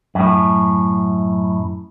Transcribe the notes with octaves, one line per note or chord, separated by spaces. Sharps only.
F#2 A2